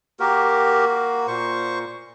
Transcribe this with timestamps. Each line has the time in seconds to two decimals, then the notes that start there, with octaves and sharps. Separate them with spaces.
0.20 A#3 F#4 G4 A#4
1.28 A#2 C5 C#6